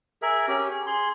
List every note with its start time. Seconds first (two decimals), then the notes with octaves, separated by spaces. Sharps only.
0.22 G#4 A#4 E5
0.48 C#4 G4
0.71 G#4
0.87 G#4 C6